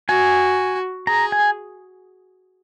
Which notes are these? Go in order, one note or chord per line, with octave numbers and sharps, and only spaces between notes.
F#4 G#5
G#4 A#5
G#5